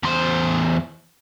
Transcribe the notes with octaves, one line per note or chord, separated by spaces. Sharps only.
E2 C5